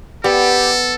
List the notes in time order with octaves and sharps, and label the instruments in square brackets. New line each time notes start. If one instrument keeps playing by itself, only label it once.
[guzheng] B3 [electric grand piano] G4 D5 [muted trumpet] A4